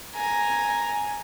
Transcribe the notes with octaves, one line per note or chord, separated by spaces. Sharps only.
G#5 A#5